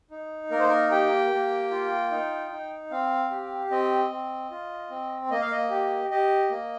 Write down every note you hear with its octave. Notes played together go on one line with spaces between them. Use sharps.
D#4
A#3 A#4
C5
A#4
G4 G5
A#3
F4
D#4
D#4
C4 F5
G4
C4 D#5
C4
F4
C4
A#3 D#5
F5
D#5
G4
G4 D#5
A#3